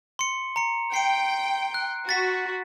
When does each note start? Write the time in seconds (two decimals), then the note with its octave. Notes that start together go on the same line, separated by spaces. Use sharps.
0.19 C6 C#7
0.56 A#5 C#7
0.94 G5 C7 D7
1.74 F#6
2.09 F#4 A6 B6